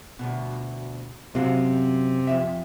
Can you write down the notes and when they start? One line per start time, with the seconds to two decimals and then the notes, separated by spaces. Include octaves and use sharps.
0.19 D2 B2
1.35 F#2 C3 F#4 F5
2.27 F2 E5